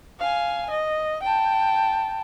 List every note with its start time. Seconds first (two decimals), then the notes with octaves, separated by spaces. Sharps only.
0.20 F5 G#5
0.70 D#5
1.23 G5 A5